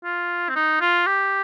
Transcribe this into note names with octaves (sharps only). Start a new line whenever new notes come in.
F4
C4
D#4
F4
G4